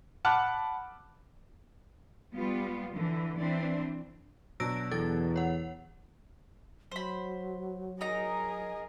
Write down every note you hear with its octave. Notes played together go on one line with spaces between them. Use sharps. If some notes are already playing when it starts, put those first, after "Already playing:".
F#5 A5 B5 D6 F6 F#6
G3 B3 F4
D3 E3
E3 C4 D4 C5
B2 F#3 D4 E6 A#6 D7
E2 A4 A6
C#5 F#5
F#3 C5 B5
D#4 G#4 A#4 D#5 A#5